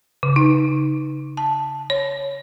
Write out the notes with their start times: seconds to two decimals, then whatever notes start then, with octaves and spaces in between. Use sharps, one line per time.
0.23 C#3
0.36 D#4
1.37 A5
1.90 C#5